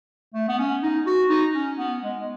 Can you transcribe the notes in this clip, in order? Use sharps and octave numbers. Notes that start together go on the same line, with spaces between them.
A3
B3
C#4
D#4
F#4
D#4
C#4
B3
G#3